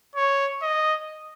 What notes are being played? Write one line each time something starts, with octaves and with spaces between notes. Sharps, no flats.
C#5
D#5